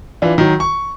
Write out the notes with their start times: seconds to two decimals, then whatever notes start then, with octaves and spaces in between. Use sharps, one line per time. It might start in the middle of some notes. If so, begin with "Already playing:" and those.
0.22 E3 D4 F4
0.38 D#3 F#3
0.60 C#6